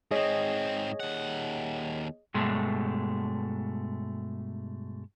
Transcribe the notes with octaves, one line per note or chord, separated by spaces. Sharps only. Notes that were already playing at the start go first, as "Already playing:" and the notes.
G#2 C4 G#4 C#5 D#5
D#2 F#5
G2 B2 G#3 A3